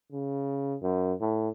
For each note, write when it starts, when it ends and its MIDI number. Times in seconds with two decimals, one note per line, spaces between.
0.12 0.76 49
0.82 1.13 42
1.21 1.49 45